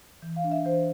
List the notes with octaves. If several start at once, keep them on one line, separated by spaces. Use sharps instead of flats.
E3
F5
D4
E5
E3 C5